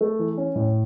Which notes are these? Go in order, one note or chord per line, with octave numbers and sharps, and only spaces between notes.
A3
E3
C#4
A2